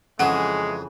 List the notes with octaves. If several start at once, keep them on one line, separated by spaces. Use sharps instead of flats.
F2 C#3 E3 G#3 G#4 F#5